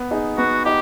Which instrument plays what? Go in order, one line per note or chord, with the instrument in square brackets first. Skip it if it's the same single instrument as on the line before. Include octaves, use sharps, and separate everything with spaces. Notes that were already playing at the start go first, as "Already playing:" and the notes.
Already playing: [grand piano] B3
D#4 G#4
[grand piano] B3 [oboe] F#4
[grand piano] D#4 [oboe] G4